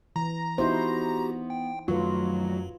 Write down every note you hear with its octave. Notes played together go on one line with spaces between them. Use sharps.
E3 A#5
B3 D#4 E4 F#4 G4 C5
G5
F#2 D#3 F3 F#3 A3 F4 B4